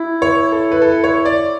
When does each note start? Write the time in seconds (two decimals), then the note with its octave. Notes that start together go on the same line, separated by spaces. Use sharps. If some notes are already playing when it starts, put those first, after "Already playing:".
Already playing: E4
0.22 C#5
0.52 A4
0.72 B4
0.82 A4
1.04 C#5
1.25 D5